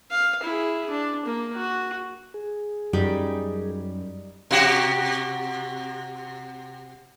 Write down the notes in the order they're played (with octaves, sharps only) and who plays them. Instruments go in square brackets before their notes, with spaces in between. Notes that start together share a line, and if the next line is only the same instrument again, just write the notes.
[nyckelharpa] F5
E4 G#4
D4
A#3
F#4
[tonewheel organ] G#4
[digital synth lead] F#2 [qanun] G3 D#4
[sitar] C3 F#4 G4